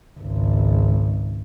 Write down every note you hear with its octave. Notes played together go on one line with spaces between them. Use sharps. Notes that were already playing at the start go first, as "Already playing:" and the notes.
G#1 C#2